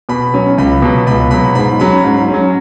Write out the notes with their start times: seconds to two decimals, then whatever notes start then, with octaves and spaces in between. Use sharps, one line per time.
0.09 B2 B5
0.34 F#3 C#4
0.58 C#2 B5
0.82 B2 F#3
1.06 C#2 B5
1.31 B2 F#3 B5
1.55 G#2 B5
1.80 F#3 C#4 B5
2.04 G#2
2.29 C#4
2.34 F#3